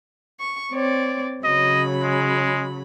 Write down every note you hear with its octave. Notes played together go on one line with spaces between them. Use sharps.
C#6
C4 C#5 D5
C#3 F#3 D#5 B5
G#3